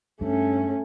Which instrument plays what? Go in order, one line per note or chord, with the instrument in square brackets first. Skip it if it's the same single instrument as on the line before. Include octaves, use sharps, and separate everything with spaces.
[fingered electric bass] G2 [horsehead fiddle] A3 C#4